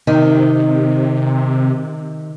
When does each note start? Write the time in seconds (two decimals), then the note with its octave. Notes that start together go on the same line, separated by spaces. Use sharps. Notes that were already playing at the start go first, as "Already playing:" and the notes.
0.07 C3 D#3